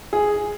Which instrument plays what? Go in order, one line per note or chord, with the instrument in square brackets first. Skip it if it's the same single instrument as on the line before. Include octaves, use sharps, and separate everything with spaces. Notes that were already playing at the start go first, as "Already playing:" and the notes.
[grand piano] G#4